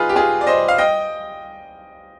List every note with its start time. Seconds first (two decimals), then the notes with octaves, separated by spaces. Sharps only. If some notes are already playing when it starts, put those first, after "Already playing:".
Already playing: D#4 F4 G#4 B4
0.09 G4
0.16 F4 G#4
0.41 D5
0.47 C5 D#5
0.68 F5
0.78 D#5 G5